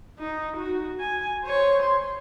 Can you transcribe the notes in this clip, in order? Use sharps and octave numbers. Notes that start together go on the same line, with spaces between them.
D#4
F#4
G#5
C5 C#5
C6